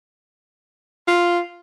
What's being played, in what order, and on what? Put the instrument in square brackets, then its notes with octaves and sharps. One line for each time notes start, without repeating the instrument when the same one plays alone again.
[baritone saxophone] F4